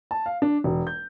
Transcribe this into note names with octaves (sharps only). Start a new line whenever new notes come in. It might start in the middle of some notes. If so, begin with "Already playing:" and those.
A5
F5
D4
E1
G6